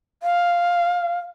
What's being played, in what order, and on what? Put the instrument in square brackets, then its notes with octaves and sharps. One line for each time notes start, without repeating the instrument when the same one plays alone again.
[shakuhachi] F5